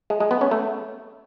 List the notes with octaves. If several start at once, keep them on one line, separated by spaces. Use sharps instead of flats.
G#3
G#3
B3
C#4
A3